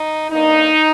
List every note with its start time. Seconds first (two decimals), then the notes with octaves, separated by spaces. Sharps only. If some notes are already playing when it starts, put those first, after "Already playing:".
Already playing: D#4
0.31 G2 D#3 A#3 D#4